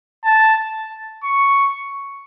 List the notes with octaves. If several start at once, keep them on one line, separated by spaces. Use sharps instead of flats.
A5
C#6